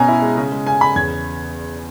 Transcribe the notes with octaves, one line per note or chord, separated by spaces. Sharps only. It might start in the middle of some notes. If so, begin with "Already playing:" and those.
Already playing: B2 C#4 G#5 A#5
E4
G#3
C#3
G#3
C#3 G#5
C#3 B5
E2 G#6